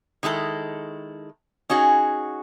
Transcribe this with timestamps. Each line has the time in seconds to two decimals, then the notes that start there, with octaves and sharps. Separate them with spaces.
0.23 D#3 G#3 E4 A4
1.70 C#4 D#4 F#4 G#4